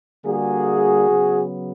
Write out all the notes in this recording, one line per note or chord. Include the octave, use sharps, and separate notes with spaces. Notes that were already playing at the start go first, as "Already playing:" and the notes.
D3 G3 A#3 F#4 G#4
C#3 F#3 B3